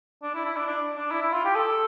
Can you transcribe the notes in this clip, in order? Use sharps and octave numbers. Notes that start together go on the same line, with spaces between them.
D4
E4
E4
D4
D4
D4
E4
E4
F4
G4
A4